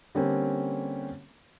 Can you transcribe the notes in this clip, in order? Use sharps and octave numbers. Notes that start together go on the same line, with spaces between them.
D3 G3 A#3 C4 C#4